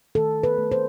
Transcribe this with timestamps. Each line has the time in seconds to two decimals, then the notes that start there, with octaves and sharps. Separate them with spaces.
0.15 D#3 A4
0.43 B4
0.58 A3
0.72 C5